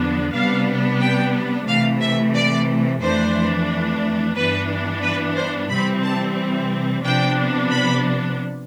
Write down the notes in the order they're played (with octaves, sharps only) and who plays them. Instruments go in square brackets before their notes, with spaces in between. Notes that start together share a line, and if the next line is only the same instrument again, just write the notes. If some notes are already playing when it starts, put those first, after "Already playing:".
Already playing: [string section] E2 D3 F3 B3 D4
C3 G3 B3 D4 F5
G5
C3 E3 A3 F5
E5
D5
F2 E3 A3 D4 C5
G2 E3 B3 D4 B4
B4
C5
C3 E3 G3 C4 B5
A5
C3 F3 B3 D4 G5
B5